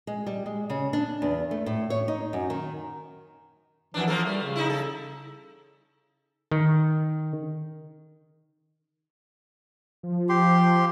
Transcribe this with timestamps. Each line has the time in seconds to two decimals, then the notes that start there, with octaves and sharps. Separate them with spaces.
0.07 G#3
0.26 G3
0.46 G#3
0.70 C#3
0.93 D4
1.22 E2
1.51 A3
1.66 A2
1.90 C#5
2.08 D#4
2.33 F#2
2.50 D#3
3.94 F2 E3 D4
4.07 F3 A#3 A4
4.25 G3 A3
4.43 C#3
4.56 D#4 E4
4.70 A4
6.51 D#3
10.03 F3
10.29 G4 C6